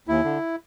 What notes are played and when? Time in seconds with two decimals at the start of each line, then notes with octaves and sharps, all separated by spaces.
0.08 D#2 E4
0.24 D3